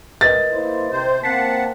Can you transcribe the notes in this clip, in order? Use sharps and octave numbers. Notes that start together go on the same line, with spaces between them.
A#4 B4 D#5 A6
A#3 E4 C5
C3 C5
A#3 C4 F#5 A5 B6 C7